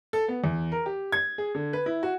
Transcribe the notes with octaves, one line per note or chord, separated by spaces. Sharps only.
A4
B3
E2
A#4
G4
G#6
G#4
D3
B4
E4
F#4